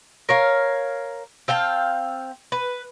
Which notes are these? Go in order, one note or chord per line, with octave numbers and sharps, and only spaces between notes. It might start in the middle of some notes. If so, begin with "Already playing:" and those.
A#4 C#5 F5
C4 F5 G5 A5
B4